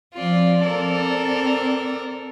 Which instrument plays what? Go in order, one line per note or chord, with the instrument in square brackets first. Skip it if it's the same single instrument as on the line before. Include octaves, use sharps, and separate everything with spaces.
[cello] F3 C4 [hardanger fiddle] F4 D5
[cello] C4 D5 [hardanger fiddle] A4 A#4